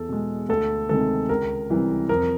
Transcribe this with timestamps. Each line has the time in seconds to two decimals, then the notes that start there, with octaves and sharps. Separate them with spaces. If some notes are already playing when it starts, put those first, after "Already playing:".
Already playing: E2 A4
0.09 B2 G#3
0.49 D2 A4
0.89 C3 D#3 G#3 A4
1.29 C#2 A#4
1.70 C3 E3 G3
2.09 F2 A#4